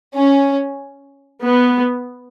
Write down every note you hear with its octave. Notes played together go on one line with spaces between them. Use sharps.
C#4
B3